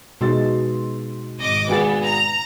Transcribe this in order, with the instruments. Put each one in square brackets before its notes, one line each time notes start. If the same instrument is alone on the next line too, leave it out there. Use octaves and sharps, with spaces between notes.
[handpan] B2 G#3 D#4 [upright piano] C6 E6 A6
[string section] G#1 D#5 D6
[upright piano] G#1 G#4 A6 [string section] B3
[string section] A#5